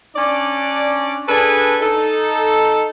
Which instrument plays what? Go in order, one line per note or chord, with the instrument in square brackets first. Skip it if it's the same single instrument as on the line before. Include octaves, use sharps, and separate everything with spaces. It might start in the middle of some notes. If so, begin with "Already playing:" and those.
[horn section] C#4 D4 D5
D4 G#4 A4 B4 G#5
D#4 A4